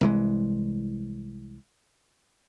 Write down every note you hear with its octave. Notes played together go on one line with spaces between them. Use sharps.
C2 E3 G#3